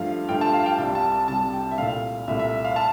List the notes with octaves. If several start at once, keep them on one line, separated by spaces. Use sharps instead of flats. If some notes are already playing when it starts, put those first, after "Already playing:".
Already playing: G2 F3 A3 F5
G2 F3 A3 G5
A5
F5
G5
C2 C3 G3 A5
A5
A5
C2 C3 G3 A5
G5
E5
C2 A#2 A3 F5
C2 A#2 A3 E5
E5
F5
A5